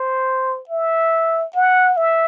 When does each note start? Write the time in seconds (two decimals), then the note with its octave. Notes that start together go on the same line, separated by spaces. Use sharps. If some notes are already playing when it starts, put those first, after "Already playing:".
Already playing: C5
0.69 E5
1.55 F#5
1.97 E5